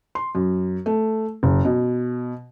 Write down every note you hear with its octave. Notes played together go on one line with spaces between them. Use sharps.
C6
F#2
A3
F#1
B2